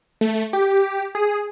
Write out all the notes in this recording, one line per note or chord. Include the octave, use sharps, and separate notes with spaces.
A3
G4
G#4